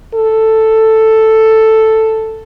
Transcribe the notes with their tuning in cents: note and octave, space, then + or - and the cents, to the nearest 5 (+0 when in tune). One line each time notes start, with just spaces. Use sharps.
A4 +5